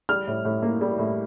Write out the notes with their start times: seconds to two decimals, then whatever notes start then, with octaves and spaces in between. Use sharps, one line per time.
0.09 G3 F6
0.27 A2
0.45 A2
0.62 A#3
0.81 G3
0.99 A2